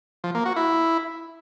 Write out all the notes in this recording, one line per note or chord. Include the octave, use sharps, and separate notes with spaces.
F3
A#3
F#4
E4